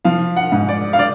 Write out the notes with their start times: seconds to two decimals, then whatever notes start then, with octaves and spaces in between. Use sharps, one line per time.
0.05 F3 F5
0.37 F#5
0.52 G#2
0.69 D5
0.93 F5
0.99 D5